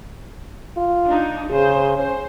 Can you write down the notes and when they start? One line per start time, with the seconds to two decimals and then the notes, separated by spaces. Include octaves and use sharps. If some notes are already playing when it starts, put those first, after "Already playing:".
0.77 F4
1.06 D4 D#4
1.51 C#3 G#4 C5
1.97 C#4 C5